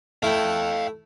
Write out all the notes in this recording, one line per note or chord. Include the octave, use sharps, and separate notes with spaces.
A3 E4 F5 G5